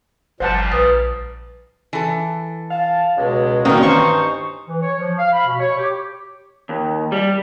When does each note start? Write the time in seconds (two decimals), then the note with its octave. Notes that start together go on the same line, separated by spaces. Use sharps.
0.40 G1 A#2 F3 G3 C5 F#5 A5
0.72 A#1 B4 D#6
1.93 E3 A4
2.70 F5 A5
3.16 C#2 B2 G#3
3.65 D#3 E3 A#3 C4 C#4 D#4 F#4
3.83 G2 C5 C#6
4.67 E3
4.82 C#5
4.97 F3
5.17 F5
5.33 B5
5.45 B2
5.59 C#5
5.77 G4
6.69 D#2
7.12 G3